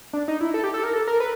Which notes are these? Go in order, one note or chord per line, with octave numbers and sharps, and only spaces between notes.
D4
D#4
E4
A4
G4
A4
A#4
A4
A#4
B4